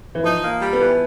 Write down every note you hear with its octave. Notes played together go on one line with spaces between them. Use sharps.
E3
F3 D#4
A#3
G3
B3
E3